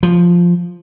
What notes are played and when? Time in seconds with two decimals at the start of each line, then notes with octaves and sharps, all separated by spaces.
0.03 F3